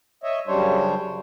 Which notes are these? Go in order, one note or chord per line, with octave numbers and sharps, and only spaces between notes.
C#5 D#5 E5
F#2 C#3 G3 D4 C5 C#5